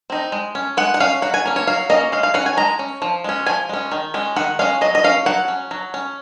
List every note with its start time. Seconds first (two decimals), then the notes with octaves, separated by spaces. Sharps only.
0.10 C4 D#4
0.32 G#3
0.55 C#4
0.77 G#3 F#5
0.94 F#5
1.00 C#4 F5
1.22 F#3 F#5
1.34 G#5
1.45 A#3 C#4
1.56 C#5
1.67 F#3 F5
1.90 A#3 C#4 D#5
2.12 G#3 F5
2.23 F5
2.34 C#4 F#5
2.46 G#5
2.57 G#3 A#5
2.79 C#4
3.02 F3
3.24 G#3 C#4
3.46 F3 G#5
3.69 G#3 C#4
3.92 D#3
4.14 G#3 C#4
4.36 D#3 F#5
4.59 G#3 C#4 F5
4.81 F#3 D#5
4.95 D#5
5.04 C#4 F5
5.26 F#3 F#5
5.48 C#4
5.71 F#3
5.94 C#4